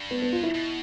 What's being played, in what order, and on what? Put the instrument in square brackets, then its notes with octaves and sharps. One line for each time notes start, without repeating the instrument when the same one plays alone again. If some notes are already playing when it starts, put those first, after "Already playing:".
Already playing: [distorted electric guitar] G2
[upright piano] B3
B3
F4
E4
[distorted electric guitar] B2